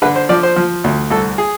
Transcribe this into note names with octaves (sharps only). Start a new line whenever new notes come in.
D3 B4
C5
F3 D5
C5
F3
D2
C2 A4
G#4